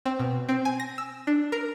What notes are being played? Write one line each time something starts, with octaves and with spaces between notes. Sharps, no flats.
C4
B2
C4
G#5
A#6
E6
D4
A#4